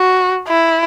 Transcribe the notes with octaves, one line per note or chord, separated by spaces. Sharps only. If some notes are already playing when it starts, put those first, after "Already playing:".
Already playing: F#4
E4